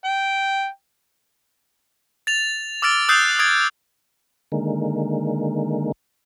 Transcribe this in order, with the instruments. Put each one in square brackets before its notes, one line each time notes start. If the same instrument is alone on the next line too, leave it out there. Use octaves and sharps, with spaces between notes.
[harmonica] G5
[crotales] A6 F7
D6 E6 F6 A6 D7
D#6 E6 F#6 G6 A6 C7
D#6 G#6 A6 D7
[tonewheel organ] D3 D#3 G#3 A#3